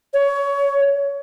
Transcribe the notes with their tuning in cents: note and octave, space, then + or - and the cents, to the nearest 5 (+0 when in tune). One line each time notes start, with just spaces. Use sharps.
C#5 +20